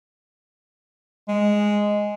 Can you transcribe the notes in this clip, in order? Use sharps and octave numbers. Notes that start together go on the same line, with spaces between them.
G#3